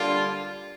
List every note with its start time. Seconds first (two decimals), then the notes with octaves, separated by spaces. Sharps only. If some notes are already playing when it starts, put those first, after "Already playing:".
Already playing: D3 G3 A#3 D4 F4